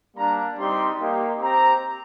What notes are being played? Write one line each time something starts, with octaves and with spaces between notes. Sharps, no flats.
G3 A#3 D4 A#5
G3 C4 D#4 G4 C6
A#3 D#4 G4
C4 G4 A#5